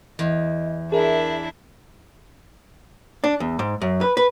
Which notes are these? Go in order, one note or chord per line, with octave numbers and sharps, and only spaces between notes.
E2 D#5
D4 E4 G#4 A#4 E5
D4
E2
G#2
F#2
B4
B4